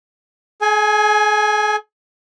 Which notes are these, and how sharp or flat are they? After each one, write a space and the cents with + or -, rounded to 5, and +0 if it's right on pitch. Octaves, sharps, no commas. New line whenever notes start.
G#4 +40 G#5 +0